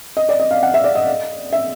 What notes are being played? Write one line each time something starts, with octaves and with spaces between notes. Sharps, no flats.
D#5
D5
D#5
F5
F#5
E5
D5
D#5
E5